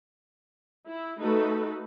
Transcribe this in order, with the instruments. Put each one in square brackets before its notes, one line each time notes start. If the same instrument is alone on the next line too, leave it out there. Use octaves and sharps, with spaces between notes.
[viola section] E4
A3 D#4 F#4 A4 B4